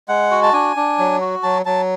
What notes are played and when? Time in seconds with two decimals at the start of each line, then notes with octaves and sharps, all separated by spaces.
0.09 G#3 F#5
0.31 F#4
0.43 A5
0.53 D4 G#5
0.77 D4
0.99 F#3
1.21 F#4
1.43 F#3 A5
1.66 F#3 A5